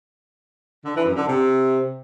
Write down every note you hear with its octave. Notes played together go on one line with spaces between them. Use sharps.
D3
E3
F#2
D3
C3